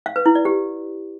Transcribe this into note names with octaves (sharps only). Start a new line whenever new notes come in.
F5
B4
E4
D5
G4